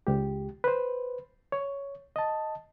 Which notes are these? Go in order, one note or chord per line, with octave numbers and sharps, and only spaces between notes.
C#2 G#3 G4
B4 C5
C#5
D#5 A5